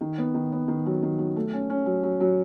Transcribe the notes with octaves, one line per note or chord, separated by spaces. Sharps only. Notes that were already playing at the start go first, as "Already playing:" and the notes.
D#3
B3
D#3
B3
D#3
F#3
D#3
F#3
A3
C#4
C#4
F#3
F#3
F#3